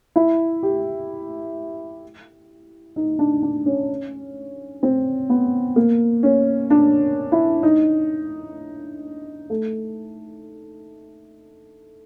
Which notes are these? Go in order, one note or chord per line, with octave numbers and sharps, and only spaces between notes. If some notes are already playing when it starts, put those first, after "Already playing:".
E4
G4
D#4
D4
D4
C#4
C4
B3
A#3
C#4
D4
E4
D#4
A3